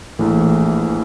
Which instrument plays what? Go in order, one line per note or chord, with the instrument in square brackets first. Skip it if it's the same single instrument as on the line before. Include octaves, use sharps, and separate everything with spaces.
[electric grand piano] A#1 A2 E3